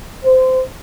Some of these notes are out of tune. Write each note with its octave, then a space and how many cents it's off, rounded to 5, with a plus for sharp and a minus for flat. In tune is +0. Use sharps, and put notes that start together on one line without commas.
C5 -20